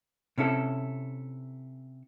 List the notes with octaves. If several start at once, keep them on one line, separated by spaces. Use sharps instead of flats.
C3 C#4 E4 A4